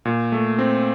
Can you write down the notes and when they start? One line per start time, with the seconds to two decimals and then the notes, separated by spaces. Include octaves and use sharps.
0.05 A#2
0.32 A3
0.59 C4